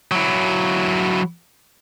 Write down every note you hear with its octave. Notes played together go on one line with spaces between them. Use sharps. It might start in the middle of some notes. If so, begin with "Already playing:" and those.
F#3 E4